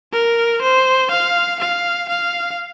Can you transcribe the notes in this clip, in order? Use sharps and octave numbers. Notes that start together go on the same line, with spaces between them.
A#4
C5
F5
F5
F5